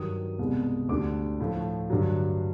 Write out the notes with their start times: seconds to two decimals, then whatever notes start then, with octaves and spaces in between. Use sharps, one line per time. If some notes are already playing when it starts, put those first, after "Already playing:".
Already playing: G2 D#3 F#3 D#6
0.39 C2 B2 G#3
0.89 D2 D3 G3 D6
1.40 A2 F3 A3
1.90 G2 D3 F#3